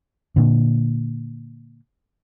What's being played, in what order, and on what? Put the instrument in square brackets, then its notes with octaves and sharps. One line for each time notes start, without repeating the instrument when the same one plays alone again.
[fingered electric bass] A#2 D3